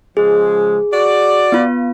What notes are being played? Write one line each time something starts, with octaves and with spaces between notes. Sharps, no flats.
C#3 F3 G#3 G#4
F#4 D5
B3 F4